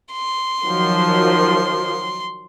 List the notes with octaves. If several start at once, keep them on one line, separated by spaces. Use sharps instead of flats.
C6
D#3 F3 F#3